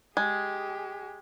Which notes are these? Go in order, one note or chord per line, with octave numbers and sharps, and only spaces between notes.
G#3 G4 G#4